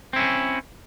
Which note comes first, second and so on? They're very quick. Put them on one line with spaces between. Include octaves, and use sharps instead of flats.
C4 E4 C#4